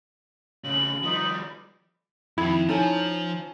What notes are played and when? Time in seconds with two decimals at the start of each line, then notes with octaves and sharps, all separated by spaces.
0.64 A2 C#3 F#7
1.03 F3 G3 D#4 B4
2.38 F2 D#3 E4 G#6
2.69 F3 C#4 D#4 A4 G#5